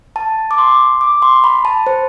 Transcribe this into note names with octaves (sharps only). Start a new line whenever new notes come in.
A5
D6
C6
D6
C6
B5
A5
C5